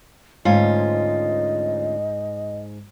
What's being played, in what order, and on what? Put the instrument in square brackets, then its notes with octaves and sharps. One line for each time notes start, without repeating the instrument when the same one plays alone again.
[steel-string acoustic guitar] D2 C#4 F4 [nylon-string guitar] G#2 [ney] D#5